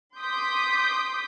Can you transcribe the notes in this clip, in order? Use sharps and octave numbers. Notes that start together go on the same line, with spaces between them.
C6 D6 D#6 G6 B6